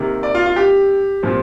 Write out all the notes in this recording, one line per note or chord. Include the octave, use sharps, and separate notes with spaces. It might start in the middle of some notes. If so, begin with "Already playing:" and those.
Already playing: C3 D#3 A#3
D5
F4
F4
G4
A#2 F3 C4